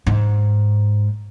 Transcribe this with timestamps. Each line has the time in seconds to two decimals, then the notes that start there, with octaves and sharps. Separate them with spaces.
0.06 G#2